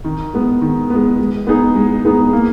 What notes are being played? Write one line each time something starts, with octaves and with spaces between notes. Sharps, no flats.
D#3
G#3 B3
D#3
G#3 B3
G#3
B3 D#4 G#4
G#3
B3 D#4 G#4
A#3